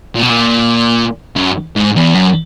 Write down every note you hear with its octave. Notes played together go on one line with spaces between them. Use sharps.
A#2
B2
A#2
F#2
G#2
E2
F#2